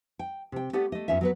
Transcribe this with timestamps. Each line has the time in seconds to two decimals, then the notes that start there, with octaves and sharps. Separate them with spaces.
0.19 G5
0.52 C3 G5
0.73 A3 B3 G4 D5 F#5
0.92 A3 D#5
1.08 F#2 B3 C#4 F4 E5
1.21 F#3 B3 B4